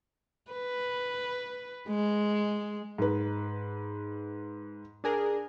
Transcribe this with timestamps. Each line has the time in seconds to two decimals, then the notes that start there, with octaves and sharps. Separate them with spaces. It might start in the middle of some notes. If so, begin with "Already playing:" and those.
0.51 B4
1.88 G#3
2.98 G#2 B4
5.04 D4 G#4 A#4